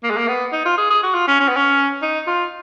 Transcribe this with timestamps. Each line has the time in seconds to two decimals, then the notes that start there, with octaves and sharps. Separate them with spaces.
0.03 A#3
0.10 G#3
0.18 A#3
0.28 B3
0.53 D#4
0.65 F4
0.78 G#4
0.90 G#4
1.03 F#4
1.15 F4
1.28 C#4
1.40 C#4
1.49 B3
1.56 C#4
2.02 D#4
2.27 F4